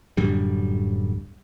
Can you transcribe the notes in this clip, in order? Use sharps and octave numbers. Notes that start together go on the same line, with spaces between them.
D1 F#2 D3 G3